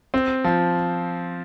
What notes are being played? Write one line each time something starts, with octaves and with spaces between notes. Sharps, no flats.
C4
F3